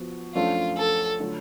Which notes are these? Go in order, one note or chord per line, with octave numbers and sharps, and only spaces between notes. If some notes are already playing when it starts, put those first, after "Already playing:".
Already playing: F3 B3 F#4
F#2 F3 A3 D4 F4
A4
D3 F#3 A3 F4